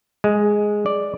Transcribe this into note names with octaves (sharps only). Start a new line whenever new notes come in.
G#3
D5